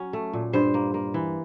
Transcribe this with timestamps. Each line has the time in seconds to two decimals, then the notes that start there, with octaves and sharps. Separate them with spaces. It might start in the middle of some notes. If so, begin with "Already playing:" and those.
Already playing: F#3 C#4
0.13 A3
0.33 A#2
0.53 G2 C5
0.74 A#3
0.94 A#3
1.14 E3